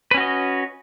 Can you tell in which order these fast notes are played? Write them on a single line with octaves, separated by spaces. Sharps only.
B4 C#4 F#4 D#5